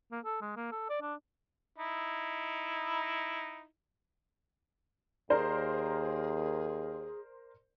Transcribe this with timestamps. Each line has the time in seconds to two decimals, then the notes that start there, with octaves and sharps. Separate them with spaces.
0.11 A#3
0.24 A4
0.41 G#3
0.56 A#3
0.71 A4
0.89 D5
1.01 D4
1.78 D#4 E4
5.30 D#2 G#4 A#4 C5 D5